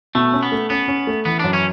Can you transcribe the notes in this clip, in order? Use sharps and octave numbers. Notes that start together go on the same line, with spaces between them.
B2 A3
C#4
B3
A3
B3 C#4
C#4
A3
E3 B3
F#2 D4
C#4